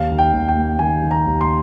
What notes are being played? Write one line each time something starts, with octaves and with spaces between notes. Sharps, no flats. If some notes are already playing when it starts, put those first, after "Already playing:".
Already playing: D#2 F5
D#3
G5
D#2
G5
A#3
D#3 G#5
D#3
A#5
D#2
C6